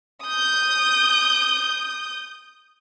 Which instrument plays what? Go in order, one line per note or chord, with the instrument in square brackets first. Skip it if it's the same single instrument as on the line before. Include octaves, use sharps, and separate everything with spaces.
[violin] D#6 G6